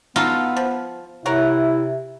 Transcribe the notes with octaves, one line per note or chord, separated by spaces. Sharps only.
B3 D#4 F4 F#4 A4
F3
C3 E4 A#4 C#5 F#5